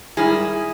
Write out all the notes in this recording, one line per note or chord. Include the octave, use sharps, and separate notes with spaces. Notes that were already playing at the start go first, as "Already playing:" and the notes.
G#2 D#3 G3 E4 G#4